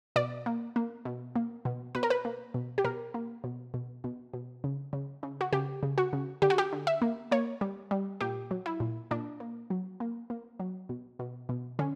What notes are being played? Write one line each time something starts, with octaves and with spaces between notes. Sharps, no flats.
B2 D5
A#3
A#3
B2
A#3
B2
B2 B4
A#4
B4
A#3
B2
G4
B2 A#4
A#3
B2
B2
B2
B2
C#3
C#3
C#3
F#4
C#3 G4
C#3
F#4
C#3
D3 G4
F#4
G4
D3
E5
A#3
A#3 C#5
G3
G3
A#2 G4
F#3
E4
A#2
A#2 D4
A#3
F#3
A#3
A#3
F#3
B2
B2
B2
D3 C#4